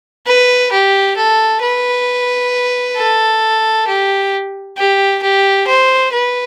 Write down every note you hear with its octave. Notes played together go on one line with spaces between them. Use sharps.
B4
G4
A4
B4
A4
G4
G4
G4
C5
B4